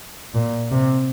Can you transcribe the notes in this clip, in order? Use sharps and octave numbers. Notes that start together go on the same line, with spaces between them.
A#2
C3